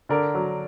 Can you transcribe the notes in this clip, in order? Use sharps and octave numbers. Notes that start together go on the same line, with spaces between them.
D3 A#4 D5
F#3